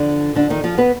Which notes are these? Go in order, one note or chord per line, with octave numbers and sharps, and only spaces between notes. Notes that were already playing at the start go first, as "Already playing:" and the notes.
Already playing: E2 D3 F3 D4
D3 D4
D#3 D#4
F3 F4
B3 B4